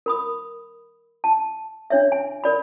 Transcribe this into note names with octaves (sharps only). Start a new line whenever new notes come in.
A#4 B5 D#6
A5
D4 C#5 E5
G#5
A#4 D5 B5